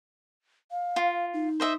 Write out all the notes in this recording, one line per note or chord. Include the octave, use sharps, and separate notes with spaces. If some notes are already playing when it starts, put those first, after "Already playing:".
F5
F4
D#4
C5 D#5 E5